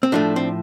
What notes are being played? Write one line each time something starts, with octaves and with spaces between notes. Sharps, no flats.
C4
A2 F3 A3 D4
C4